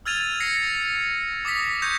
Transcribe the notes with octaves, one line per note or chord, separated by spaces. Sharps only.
E6 F6 G#6 A6 D#7 F7
A#6 C7 C#7
D6 D#6 A#6 B6
C#6 G6 G#6 A#6 C#7